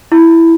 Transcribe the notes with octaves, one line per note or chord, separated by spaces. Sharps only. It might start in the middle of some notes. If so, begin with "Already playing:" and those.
E4